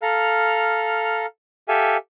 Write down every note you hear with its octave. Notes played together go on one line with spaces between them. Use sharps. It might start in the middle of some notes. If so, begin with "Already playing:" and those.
A4 F5 A#5 F6
G4 A4 E5 F5 G#5